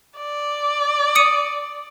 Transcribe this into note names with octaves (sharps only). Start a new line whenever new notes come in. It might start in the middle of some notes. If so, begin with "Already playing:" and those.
D5
D#6 C#7 D#7